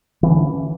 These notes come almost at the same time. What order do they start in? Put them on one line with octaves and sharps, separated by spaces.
E3 C4 D3 C#4